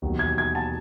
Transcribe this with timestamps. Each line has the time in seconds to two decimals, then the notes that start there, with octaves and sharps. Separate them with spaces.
0.02 E1 D#2 D#3 F#3
0.19 G#6
0.38 G#6
0.55 A5